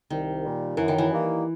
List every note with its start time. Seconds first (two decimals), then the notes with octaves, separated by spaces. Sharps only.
0.10 C2 D#3
0.44 A#2 G3
0.77 F#2 E3
0.88 D#3
0.98 E3
1.11 D#3 G3 A#3